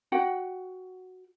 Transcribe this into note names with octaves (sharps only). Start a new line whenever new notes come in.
F#4 F#5 G5